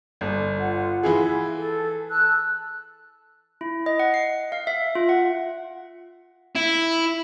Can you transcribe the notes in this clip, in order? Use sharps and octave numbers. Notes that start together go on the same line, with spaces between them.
G1
F4 F#5
E3 E4 G#4
A4
A5 E6 F#6
E4
D#5
F#5
C7
F5
E5
F4
F#5
E4